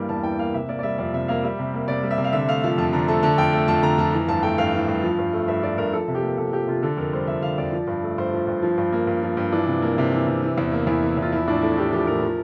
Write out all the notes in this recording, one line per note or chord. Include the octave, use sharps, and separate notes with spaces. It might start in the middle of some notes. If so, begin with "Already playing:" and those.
Already playing: G2 E3 G3 A#3
E2 A5
E3 G5
A#3 F5
C3 E5
A#3 D5
D5
G3 E5
F2 D5
C3 E5
A#3 F5
G3 E5
C3
A#3
C3 D5
G3
E5
C3
F5
D3 E5
A3 F5
F3 F5
F2 A5
D3 A#5
A3 A5
D3 A5
F2 G5
A3
F2 A5
D3 A#5
F2 A5
E3 A#5
G2 A5
A3 G5
G2 F5
E3
G2
F3
G2
A3
G2 E5
F3 D5
G2 A#4
F3 A4
C3
G4
A#3
C3 A4
F3 G4
C3 F4
D3 A4
F2 A#4
G3 C5
F2 E5
D3 F5
F2 D5
F3
G2
A3
G2 C5
F3
G2
F3
G2
A#3
G2
F3
G2
E3 D4
C3
A#3
C3
E3
C3
E3
E2
A#3
E2 E4
E3
E2
F4
F3 E4
A2 D4
A3 E4
A2 G4
F3 G4
A2 A#4
F3